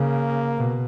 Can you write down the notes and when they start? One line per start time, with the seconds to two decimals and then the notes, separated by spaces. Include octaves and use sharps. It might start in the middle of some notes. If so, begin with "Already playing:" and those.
Already playing: C#3 A#3
0.57 B2